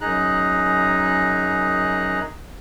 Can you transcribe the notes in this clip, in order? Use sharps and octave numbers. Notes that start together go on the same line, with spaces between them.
F#2 D#4 G#4 A#5 F#6